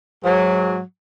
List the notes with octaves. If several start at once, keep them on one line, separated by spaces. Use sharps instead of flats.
G#2 F#3